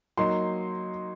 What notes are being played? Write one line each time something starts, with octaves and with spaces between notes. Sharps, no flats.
F#3 A#3 D#4 C6